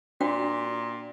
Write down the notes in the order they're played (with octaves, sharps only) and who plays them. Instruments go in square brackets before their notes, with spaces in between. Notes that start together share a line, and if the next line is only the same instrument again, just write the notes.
[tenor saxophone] A#2 [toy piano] D4 F#4 G5